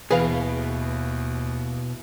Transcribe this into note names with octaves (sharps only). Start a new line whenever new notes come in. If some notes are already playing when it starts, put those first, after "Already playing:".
D#2 B2 E3 G#4 B4 F5